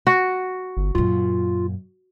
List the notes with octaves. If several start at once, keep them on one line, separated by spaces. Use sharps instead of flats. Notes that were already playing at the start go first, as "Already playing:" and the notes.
F#4
G1
F#2 A#2 F4